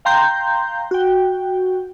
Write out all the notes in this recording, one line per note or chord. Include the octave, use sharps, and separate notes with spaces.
F5 G5 A#5 C6 G6
F#4 G5